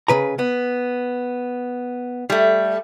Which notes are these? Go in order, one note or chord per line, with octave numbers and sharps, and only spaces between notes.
C#3 B4 A#5
B3
G3 A3